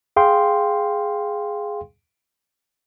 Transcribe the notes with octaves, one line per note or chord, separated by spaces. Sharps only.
G#4 F5 G5 C6